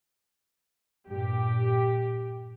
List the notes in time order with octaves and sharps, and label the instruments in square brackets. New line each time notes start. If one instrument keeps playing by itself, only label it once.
[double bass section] G2 A#2 [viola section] G4